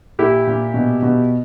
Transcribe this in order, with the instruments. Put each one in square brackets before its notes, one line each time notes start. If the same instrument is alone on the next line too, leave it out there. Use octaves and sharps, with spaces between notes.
[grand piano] A#2 E4 G4
A#2
B2
B2